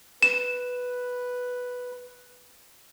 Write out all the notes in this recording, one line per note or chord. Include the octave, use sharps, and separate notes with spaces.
B4 E7